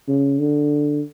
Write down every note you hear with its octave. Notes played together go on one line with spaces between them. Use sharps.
C#3
D3